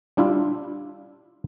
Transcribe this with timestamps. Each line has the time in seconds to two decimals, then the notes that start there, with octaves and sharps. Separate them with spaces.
0.17 G3 D4 E4 F4 E5